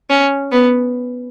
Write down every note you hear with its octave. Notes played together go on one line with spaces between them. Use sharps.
C#4
B3